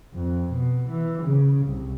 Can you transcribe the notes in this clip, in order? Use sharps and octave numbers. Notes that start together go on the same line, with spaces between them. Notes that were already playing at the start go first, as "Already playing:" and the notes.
F2
B2
E3
C#3
C2